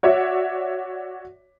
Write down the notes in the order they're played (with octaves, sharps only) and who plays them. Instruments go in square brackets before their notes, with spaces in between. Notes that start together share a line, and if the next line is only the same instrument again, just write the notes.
[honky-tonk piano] F#4 C#5 D5 E5